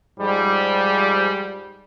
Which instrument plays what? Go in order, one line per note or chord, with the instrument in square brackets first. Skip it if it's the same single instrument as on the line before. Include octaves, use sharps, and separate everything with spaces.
[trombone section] G#2 F3 G3